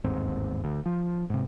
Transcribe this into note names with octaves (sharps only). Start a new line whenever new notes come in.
G1 D#2 G#2 C4
D2
F3
G#2 C3